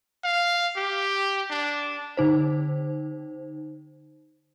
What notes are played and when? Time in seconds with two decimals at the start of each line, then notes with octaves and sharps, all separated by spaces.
0.24 F5
0.76 G4
1.51 D4
2.17 D3 D#4 C5